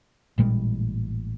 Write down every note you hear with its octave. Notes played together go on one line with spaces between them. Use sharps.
A1 A#2 G3 G#3